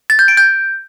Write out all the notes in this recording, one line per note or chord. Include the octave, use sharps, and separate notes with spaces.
A6
G6
D7
G6